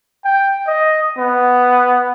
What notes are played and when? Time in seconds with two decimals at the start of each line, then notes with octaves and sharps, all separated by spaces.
0.25 G5
0.68 D#5
1.18 B3